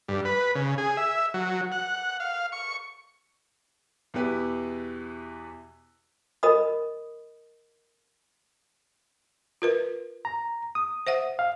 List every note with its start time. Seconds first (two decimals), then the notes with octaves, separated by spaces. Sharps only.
0.08 G2
0.25 B4
0.55 C#3
0.78 G#4
0.97 E5
1.34 F#3
1.72 F#5
2.20 F5
2.52 C#6
4.14 E2 B2 E4 G4 B4
6.43 A#4 D#5 B5 D#6
9.62 F4 A#4 B4
10.25 A#5
10.75 D#6
11.07 C5 E5 F#5
11.39 F5